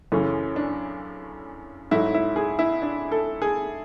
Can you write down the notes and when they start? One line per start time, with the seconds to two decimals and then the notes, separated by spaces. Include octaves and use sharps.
0.12 F#2 C#3 E3 A3 C#4
0.56 D4
1.91 G#2 F#3 A3 E4
2.14 E4
2.36 G#4
2.59 E4
2.82 D4
3.12 A4
3.42 G#4